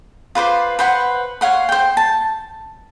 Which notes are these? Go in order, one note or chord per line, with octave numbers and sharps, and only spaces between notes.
F4 B4 C5 D6
B4 C5 F#5
C#5 F5 F#5 C6
C5 G5
A5